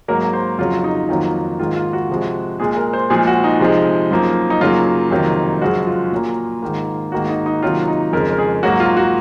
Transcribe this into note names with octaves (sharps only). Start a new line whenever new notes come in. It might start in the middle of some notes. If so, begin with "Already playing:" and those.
G#2 F#3 A#3 A#4
C5
F2 C#3 F#3 F4
D#4
F2 D#3 F#3 A#3 F4
G#2 D#3 A#3 F4
F4
F#4
C3 F3 G#3
A#2 G#3 G#4
A#4
C5
A#2 F3 G#3 G#4
F#4
D#4
C3 F3 G#3
F#2 F3 A#3
D#4
F#2 C#3 F#3 A#3 F4
F2 C3 D#3 F#3 A#3
F#2 C#3 F3 G#3 F#4
F4
A#2 F#3 A#3
G#2 D#3 A#3
G#2 D#3 A#3 F#4
D#4
D#4
C3 D#3 F#3 A#3 F4
D#4
F2 C#3 G#3 A#4
A#4
G#4
G#2 F#3 A#3 F#4
F4
F#4